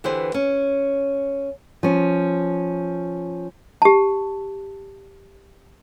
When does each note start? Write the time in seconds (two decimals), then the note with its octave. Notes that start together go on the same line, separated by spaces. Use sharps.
0.04 D3 E3 G4 G#4 B4 C5
0.34 C#4
1.83 F3 C#4
3.82 G4 A5